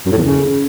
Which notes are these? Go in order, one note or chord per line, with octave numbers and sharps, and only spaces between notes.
F#2
A2
E2
C#3